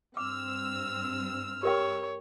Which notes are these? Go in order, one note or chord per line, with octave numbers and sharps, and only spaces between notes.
G2 C4 D6 E6 F6
G4 A#4 C#5 G5